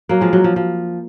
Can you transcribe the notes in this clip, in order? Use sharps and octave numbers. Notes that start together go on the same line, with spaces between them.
F#3 A#3
F3 G#3
F#3
F3
F3